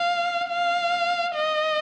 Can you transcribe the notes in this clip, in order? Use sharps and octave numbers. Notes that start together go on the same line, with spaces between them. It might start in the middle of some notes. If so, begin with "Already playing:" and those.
Already playing: F5
F5
D#5